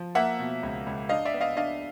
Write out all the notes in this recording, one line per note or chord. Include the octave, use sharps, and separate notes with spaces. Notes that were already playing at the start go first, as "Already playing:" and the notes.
Already playing: F3
A#3 E5 F#5
B2
C#2
C#2
D4 D#5 F5
D5 E5
B3
D#5 F5
D4 D#5 F5